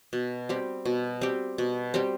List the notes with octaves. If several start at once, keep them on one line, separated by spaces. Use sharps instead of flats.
B2
G3 C4 G4
B2
G3 C4 G4
B2
G3 C4 G4